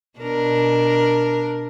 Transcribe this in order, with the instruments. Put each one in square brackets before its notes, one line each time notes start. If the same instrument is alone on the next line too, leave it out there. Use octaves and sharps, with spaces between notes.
[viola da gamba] B2 D4 A#4